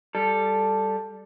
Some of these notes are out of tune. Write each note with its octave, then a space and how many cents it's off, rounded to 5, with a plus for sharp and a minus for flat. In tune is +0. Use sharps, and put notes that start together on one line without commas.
G3 +0 A4 +0